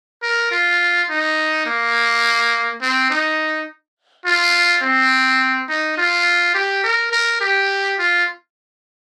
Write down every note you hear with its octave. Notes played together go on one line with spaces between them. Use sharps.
A#4
F4
D#4
A#3
C4
D#4
F4
C4
D#4
F4
G4
A#4
A#4
G4
F4